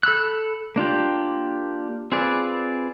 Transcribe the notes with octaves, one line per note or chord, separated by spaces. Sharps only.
A4 B5 E6 F#6
A#3 D4 F4 G4
C4 F4 G#4 B4 D5